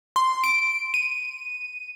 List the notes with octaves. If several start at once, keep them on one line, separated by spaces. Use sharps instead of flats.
C6
D7
D#7